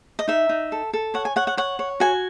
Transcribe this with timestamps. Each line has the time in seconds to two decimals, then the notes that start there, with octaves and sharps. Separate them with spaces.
0.19 D#5
0.28 D#4 E5
0.49 D#4
0.72 A4
0.93 A4
1.14 C#5 F#5
1.25 G#5
1.36 C#5 F#5
1.47 F#5
1.57 C#5 F#5
1.79 C#5
2.00 F#4 G#5